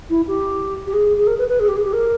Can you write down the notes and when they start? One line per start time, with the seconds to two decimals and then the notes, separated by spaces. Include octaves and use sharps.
0.10 E4
0.27 G4
0.86 G4
0.93 G#4
1.17 G#4
1.27 A#4
1.38 B4
1.49 B4
1.59 G#4
1.68 G4
1.76 G#4
1.84 G4
1.93 A#4